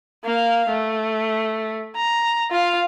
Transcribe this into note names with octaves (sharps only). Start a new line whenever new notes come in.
A#3 F5
A3
A#5
F4 F5